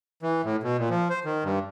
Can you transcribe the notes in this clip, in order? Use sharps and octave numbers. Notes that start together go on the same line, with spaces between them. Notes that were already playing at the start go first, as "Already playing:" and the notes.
E3
A2
B2
A#2
F3
C5
D#3
G2